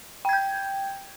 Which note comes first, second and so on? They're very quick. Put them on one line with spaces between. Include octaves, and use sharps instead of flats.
G5 G#6 G6